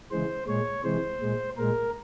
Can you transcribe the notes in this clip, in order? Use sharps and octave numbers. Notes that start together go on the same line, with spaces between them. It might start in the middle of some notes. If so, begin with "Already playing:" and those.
C#3 E3 G#3 C5
A#2 G#3 C#5
C3 E3 G#3 C5
A#2 G#3
A#2 G#3 A#4